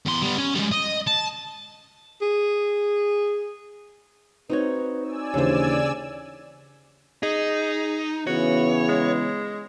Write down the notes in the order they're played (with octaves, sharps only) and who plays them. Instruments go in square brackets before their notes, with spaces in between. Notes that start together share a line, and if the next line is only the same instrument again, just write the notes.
[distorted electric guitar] E2 C6
G3 B3
C#4
G3 G#3
D#5
A5
[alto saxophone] G#4
[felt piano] C4 [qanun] D#4 F#4 C#5 [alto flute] B4
[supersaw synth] D5 G#5 E6
[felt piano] D#2 E3 C5 [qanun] C#3 [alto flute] D4
[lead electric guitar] D#4 [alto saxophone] G#4
[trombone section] C#3 E3 B3 [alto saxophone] F#4 [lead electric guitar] C#5
[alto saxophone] G#3